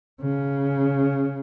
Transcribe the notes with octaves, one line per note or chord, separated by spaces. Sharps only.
C#3